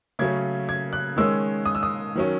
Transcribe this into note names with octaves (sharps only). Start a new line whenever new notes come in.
C#3 F#3 A3 C#4 G#6
G#6
F#6
D#3 G#3 C#4 E6
D#6
E6
D#6
D#3 F#3 C#4